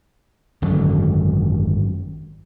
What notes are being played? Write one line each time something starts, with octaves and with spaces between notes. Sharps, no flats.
G#1 F#2 D3 F#3